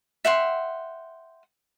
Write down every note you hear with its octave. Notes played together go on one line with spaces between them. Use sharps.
E5 F#5 G5 C6